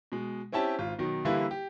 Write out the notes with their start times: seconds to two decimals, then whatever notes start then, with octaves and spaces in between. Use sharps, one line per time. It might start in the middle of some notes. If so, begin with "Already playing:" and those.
0.12 B2 G#3
0.52 C4 C#4 E4 G4 A5
0.78 G#1 F4
0.99 B2 D#3 F#3
1.25 D3 E3 G3 A#3 E4 B4
1.51 G4